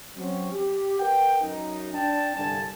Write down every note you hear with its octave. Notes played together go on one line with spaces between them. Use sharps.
F#3 C4 C#4
G4
A#4 B4 F#5 G5
F#2 D#4
D4 G5 A5
C2 G2 D3 G#5 A5